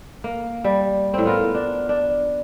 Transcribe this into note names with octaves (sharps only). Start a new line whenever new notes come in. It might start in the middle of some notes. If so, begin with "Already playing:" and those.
A#3
G3
A2 C4
B3 F4 A#4
D4
D4